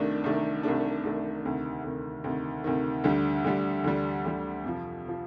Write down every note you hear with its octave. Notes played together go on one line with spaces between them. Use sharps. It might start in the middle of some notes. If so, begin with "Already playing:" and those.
Already playing: C2 C3 D#3 A3 D4
C2 C3 D#3 A3 D4
C2 C3 D#3 A3 D4
C2 C3 D#3 A3 D4
D2 C3 D#3
D2 C3 D#3
D2 C3 D#3
D2 C3 D#3
D2 D3 G3
D2 D3 G3
D2 D3 G3
D2 D3 G3
F2 C3 F3
C3 F3